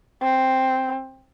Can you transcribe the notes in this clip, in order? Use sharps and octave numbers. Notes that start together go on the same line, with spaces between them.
C4